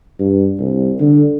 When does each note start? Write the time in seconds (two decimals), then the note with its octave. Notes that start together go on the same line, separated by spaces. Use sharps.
0.19 G2
0.59 C2
1.00 D3